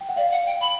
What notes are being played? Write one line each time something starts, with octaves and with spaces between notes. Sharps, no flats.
G5
F#5
D5 F5
F#5
G5
B5